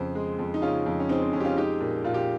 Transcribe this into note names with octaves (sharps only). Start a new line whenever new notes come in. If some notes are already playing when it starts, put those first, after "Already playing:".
Already playing: F2 C#3 C5
G#3
F2
D#4
C#3 C#4 F4
F2
C#4
G#3 C4 D#4
C4
F2 C#4
G4
C#4 F4
G#3 D#4 G4
A#2
A#2 F4
G4